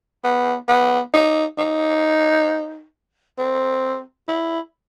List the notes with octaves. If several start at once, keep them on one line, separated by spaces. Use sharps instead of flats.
B3
B3
D#4
D#4
C4
E4